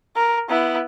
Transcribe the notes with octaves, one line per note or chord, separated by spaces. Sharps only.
A#4
B3 E4